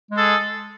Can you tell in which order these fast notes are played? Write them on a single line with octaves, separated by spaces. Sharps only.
G#3 A4 G#4